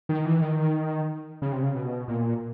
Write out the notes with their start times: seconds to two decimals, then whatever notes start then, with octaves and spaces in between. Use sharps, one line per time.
0.09 D#3
0.25 E3
0.42 D#3
1.42 C#3
1.52 C3
1.63 C#3
1.75 B2
2.08 A#2